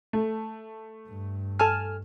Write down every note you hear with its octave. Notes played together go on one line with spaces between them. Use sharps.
A3
G2
A4 G#5 A5 F6